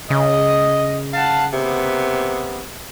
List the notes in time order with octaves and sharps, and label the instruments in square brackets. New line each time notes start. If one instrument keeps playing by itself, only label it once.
[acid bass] C#3 [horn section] D#5
[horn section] F5 F#5 A5
C3 A#3 B3